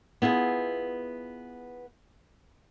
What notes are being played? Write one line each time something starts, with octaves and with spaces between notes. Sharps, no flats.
B3 E4 F4 G#4